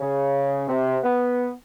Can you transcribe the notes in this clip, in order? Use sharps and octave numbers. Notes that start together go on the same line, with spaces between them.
C#3
C3
B3